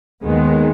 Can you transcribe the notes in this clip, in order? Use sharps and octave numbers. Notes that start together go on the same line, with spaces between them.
D#2 D#3 G#3 B3